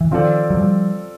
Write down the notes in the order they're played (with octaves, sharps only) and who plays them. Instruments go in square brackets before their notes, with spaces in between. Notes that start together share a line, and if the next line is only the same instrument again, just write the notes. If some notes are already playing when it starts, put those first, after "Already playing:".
[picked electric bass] E3
[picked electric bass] D#3 F3 [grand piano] C4 F4 A4 D5
[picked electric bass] F#3
F3 G3